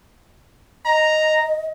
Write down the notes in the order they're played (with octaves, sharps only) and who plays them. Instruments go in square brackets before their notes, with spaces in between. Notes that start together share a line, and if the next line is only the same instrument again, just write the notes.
[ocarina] D#5 [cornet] A#5